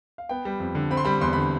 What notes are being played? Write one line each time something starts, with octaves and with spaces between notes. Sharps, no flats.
F5
B3 G5
G3
F2
D3
C4 B5
C6
G3 B5
E2 C6
D3 B5